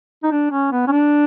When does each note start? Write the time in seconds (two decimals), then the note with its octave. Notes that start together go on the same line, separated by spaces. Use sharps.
0.23 D#4
0.31 D4
0.51 C#4
0.72 B3
0.87 C#4
0.92 D4